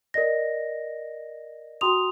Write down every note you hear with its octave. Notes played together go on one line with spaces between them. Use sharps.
A#4 D5 D#5 A#6
F#4 G5 A#5 C6 D#6 F7